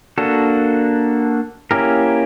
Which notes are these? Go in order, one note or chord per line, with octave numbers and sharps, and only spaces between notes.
A#3 D4 F#4 A4
A#3 C#4 E4 G4 A#4